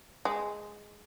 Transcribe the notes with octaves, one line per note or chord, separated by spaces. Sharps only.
G#3